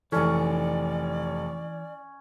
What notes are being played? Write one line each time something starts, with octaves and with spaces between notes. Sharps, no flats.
F1 E3 C#4 A4 D5